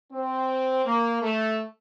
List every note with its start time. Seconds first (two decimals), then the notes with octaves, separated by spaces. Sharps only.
0.12 C4
0.85 A#3
1.22 A3